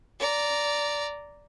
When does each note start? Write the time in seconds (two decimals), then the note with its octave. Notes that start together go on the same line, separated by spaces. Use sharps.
0.20 D5 A#5